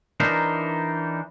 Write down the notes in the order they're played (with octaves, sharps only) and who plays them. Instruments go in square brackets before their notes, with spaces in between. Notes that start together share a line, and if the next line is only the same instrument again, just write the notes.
[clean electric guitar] E3 D4 D#4 A#4 C5